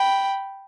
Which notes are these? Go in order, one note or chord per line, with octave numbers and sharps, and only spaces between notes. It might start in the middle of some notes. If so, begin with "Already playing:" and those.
Already playing: G5 B5